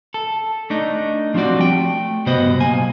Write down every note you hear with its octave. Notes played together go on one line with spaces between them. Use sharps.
A4
A3 D4 D#4
F3 G3 C4 F4 F#4 D5
A3 G5
G2 C3 B3 F#4 C5 D#5
B1 A#3 G#5